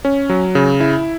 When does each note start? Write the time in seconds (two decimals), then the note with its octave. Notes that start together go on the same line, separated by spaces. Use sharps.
0.05 C#4
0.29 F#3
0.55 C#3
0.80 E4